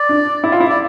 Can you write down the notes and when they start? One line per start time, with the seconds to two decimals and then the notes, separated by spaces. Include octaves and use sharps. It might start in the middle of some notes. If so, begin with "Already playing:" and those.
Already playing: D5
0.09 D4
0.44 E4
0.52 F4
0.60 E4
0.69 D5